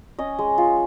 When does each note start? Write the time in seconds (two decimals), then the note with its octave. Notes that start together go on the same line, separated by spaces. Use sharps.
0.19 C#4 D#5
0.39 G#3
0.58 F4